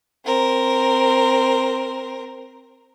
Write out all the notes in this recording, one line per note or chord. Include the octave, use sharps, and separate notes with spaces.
C4 A#4